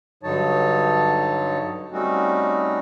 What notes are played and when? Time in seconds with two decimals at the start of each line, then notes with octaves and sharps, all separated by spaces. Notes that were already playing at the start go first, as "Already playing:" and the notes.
0.23 G2 D3 F#3 D#4 C#5 A5
1.92 G3 A3 C4 C#4 D#4 F#4